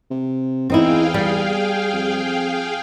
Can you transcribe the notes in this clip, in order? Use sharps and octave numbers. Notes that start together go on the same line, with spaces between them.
C3
E2 C4 D#4 E4 G#4 F5 G5
G3
F2